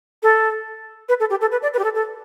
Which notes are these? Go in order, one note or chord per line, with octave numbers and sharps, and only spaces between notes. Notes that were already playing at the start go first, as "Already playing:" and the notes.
A4
B4
A4
G4
A4
B4
D5
B4
G4
A4
A4